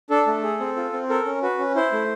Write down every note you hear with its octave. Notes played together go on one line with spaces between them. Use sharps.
D4 A4
A3
G#4
C4
F4
C4
A4 A#4
C#4
F#4 B4
C#4
E4 C5
A3